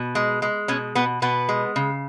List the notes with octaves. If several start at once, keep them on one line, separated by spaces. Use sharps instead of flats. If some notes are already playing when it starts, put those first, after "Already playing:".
Already playing: B2
G#3
G#3
B2 C#4
B2 B3
B2 B3
G#3
C#3